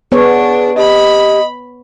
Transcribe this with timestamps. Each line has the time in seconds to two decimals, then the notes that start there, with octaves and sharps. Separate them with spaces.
0.12 B3 D4 G#4 C#5
0.77 G4 D#5 B5